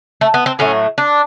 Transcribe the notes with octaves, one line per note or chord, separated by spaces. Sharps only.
A3
B3
C4
A2 F#3 A3 C#4
D4